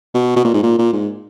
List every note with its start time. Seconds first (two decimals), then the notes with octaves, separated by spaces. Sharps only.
0.14 B2
0.36 B2
0.45 A#2
0.54 G#2
0.63 A#2
0.79 A#2
0.93 G#2